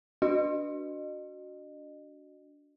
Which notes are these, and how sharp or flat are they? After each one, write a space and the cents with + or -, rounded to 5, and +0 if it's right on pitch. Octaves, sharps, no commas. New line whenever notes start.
D4 -15 F#4 +0 D#5 -30